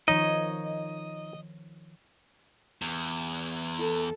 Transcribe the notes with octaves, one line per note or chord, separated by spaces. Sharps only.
D#3 F3 D#4 C#5 D#5
E2
A4